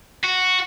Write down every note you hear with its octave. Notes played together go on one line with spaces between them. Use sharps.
F#4